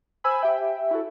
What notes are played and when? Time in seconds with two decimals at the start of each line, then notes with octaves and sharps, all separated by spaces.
0.24 C5 G#5 B5 E6
0.43 G4 E5 G5
0.91 E4 F#4 A4